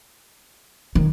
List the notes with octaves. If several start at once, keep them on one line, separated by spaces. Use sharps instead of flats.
D#3